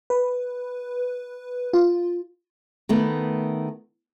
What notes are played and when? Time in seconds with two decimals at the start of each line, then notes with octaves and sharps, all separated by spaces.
0.10 B4
1.73 F4
2.89 D#3 A3 B3